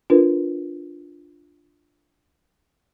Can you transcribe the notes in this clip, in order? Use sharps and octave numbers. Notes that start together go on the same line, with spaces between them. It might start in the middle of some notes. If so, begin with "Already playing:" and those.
D4 F4 A#4 B4